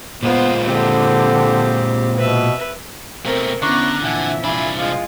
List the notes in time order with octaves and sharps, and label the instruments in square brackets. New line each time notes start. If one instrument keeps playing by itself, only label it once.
[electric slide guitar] A#2 G#3 F4 [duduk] B3 [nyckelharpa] C5
[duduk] D3 [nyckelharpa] C4 G4
[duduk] B2 [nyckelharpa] B4 E5
[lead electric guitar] B2 A3 [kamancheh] C4 A#4
[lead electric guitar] D3 [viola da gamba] B3 C#4 [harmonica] E4 D5 C#6 [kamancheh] A#5 F#6
[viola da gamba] F2 A#2 E3 [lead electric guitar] D3 [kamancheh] E5 [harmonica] F#5 G#5 A5
[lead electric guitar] C2 D4 [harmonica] F4 G#5 B5
[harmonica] F3 [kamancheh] G#3 F4